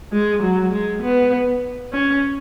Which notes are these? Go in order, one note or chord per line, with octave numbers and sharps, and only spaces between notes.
G#3
F#3
G#3
B3
C#4